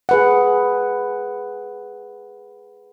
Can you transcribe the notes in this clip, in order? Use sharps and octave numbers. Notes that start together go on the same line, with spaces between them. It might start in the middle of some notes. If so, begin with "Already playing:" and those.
G#4 B4 F#5